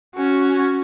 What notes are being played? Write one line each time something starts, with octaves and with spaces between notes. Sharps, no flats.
C#4 F#4